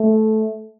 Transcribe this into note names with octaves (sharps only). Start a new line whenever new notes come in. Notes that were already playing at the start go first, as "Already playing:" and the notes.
Already playing: A3